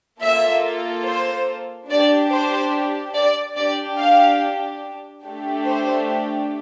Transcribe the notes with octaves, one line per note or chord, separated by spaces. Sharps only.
A#3 F4 A4 E5
C5
D4 G4 D5
C5
D5
D4 G4 D5
F5
A3 D4 G4
C5